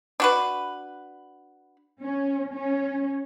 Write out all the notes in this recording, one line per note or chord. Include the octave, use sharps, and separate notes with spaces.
D4 F#4 B4
C#4
C#4